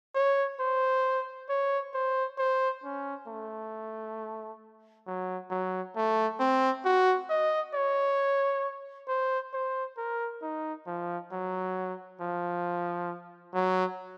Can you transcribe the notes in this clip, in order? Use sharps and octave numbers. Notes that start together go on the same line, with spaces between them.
C#5
C5
C#5
C5
C5
C#4
A3
F#3
F#3
A3
C4
F#4
D#5
C#5
C5
C5
A#4
D#4
F3
F#3
F3
F#3